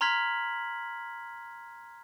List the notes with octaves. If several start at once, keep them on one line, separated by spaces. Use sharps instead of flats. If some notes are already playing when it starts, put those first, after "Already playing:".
A#5 C6 F6 G#6 B6 F#7